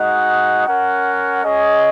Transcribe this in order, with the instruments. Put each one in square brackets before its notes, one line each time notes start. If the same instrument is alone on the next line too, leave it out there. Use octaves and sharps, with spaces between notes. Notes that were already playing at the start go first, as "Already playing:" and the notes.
Already playing: [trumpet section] G#3 D#4 F#4 D#5 F#5
C#4 A#4 F#5
C#4 G#4 D#5